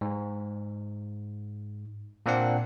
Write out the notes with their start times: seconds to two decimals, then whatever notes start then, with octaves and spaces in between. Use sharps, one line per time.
0.01 G#2
2.26 A#2 A#3 C4 D4 F#5